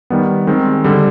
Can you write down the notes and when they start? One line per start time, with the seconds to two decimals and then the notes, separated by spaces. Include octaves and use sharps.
0.10 D#3 G3 B3
0.47 D#3 G#3 C4
0.84 D3 G3